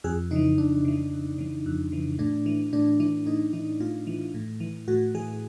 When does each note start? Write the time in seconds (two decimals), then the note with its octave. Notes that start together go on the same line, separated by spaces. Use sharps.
0.04 F2 G#4
0.31 C#3 E3 D#4
0.58 F2 D4
0.85 C#3 E3
1.12 F2
1.38 C#3 E3
1.66 F2
1.92 C#3 E3
2.19 A2 D4
2.46 E3
2.73 A2 D4
3.00 E3 D4
3.26 A2 D#4
3.53 E3 D#4
3.80 A2 F4
4.07 E3
4.34 A2
4.60 E3
4.88 A2 F#4
5.15 E3 G#4